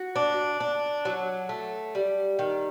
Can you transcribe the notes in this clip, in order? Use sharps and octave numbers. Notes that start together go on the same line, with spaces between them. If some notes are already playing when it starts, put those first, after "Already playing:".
Already playing: F#4
D4
D4
F#3
A3
G3
D#3